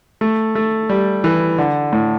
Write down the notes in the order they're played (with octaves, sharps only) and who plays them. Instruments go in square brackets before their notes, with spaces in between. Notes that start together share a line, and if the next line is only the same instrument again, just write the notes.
[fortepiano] A3
A3
G3
E3
D3
A2